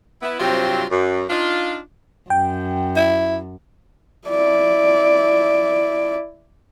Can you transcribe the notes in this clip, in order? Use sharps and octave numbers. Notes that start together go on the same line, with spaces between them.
B3 E4
G2 C3 F#3 C4 F4
F#2
D4 D#4 F4
F#2 G5
E4
E4 D5